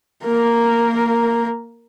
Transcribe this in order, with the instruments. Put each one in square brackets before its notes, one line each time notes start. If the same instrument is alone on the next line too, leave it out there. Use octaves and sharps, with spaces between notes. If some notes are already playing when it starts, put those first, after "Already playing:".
[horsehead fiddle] A#3 A#4